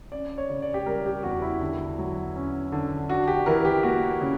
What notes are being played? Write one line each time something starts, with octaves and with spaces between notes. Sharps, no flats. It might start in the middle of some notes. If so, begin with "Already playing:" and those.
C#4 D5
C#5
C#3
D5
G4
G3 A#4
G4
E2 F#4
E4
D3
F#3
C#4
D3
D4 F#4
G4
E3 A#4
G4
A#3 F#4
C#3